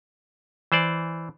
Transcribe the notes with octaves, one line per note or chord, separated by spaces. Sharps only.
E3 C5 D5